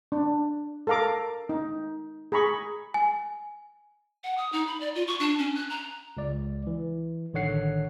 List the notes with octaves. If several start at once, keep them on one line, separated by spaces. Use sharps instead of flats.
D4
A4 A#4 F5 A#5 D6
D#4
G#4 A#5 B5 C#6
G#5
F#5
D#6
D#4
B5
D5
F4
C#6
D4
C#4
F#6
A#5
C#2 D5
E3
A1 D3 D#3 C#5 F#5 C7